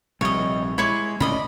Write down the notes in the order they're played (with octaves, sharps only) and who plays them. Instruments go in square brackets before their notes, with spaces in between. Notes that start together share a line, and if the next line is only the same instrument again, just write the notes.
[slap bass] A#1 C3 G3 [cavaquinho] C#5 D#5
[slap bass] G#3 [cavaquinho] E4 C#5 D6
[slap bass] C#2 A2 C#4 [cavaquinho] D5 D#5 B5